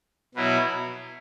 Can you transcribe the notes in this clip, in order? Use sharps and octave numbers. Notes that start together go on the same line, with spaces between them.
B2 F#3 B3 E4